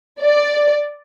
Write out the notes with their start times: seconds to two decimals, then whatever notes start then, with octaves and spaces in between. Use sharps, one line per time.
0.20 D5